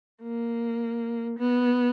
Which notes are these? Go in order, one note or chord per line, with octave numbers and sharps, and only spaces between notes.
A#3
B3